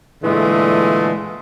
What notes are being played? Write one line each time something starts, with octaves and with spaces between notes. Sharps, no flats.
A#2 D3 E3 G#3 A3